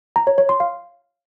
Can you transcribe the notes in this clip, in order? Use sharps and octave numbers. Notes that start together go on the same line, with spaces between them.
A#5
C#5
C#5
C6
F5